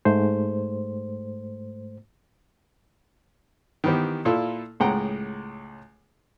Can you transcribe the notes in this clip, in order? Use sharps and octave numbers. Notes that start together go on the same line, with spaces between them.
G#2 A3 C5
D#3 E3 B3 G4 C5
A#2 E4 F4 A4 E6
C#2 A2 G#3 F#5 G5 A#5